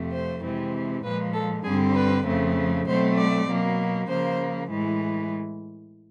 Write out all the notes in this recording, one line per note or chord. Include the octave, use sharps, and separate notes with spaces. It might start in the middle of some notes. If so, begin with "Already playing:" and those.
Already playing: F2 C3 F3 A3
C5
C3 E3 G#3 C4
A#2 F3 G#3 B4
A4
G2 D3 G3 C4 G#4
B4
F2 C#3 F3 A3 C4
B2 F#3 A3 C4 C5
D5
B2 F#3 A#3
C#3 F3 A#3 C5
A2 E3 G#3